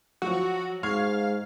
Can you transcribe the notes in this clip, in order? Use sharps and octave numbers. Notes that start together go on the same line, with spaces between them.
F3 F#3 F#4
G#2 F5 C#6 F6 G#6